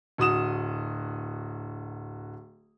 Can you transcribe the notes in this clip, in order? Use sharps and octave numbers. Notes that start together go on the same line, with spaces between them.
D1 F#4 D#6 E7